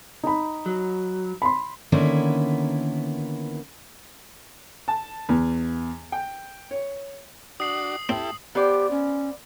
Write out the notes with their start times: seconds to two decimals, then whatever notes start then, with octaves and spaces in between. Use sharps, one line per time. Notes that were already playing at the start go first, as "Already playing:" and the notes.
0.23 D#4 B5
0.66 F#3
1.42 B5 C6
1.92 D3 D#3 A#3 B3 C#4 E4
4.88 A5
5.29 E2
6.12 G5
6.71 C#5
7.60 D4 F#4 D#6 C7 F#7
8.09 C4 E4 G4 A4
8.55 B3 G4 C5 D5
8.91 C#4